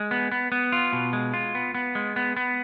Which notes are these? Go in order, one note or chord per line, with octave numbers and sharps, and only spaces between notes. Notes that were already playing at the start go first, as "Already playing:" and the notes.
Already playing: G#3
B3
B3
B3
F4
B2
G#3
F4
B3
B3
G#3
B3
B3